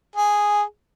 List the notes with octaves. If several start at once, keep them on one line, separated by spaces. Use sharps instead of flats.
G#4